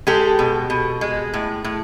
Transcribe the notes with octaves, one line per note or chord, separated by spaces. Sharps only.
G#3 G4 A4
B2
B2
G#3
A2
A2